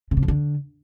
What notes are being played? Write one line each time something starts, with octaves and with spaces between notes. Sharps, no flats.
C#3
C3
F2
D3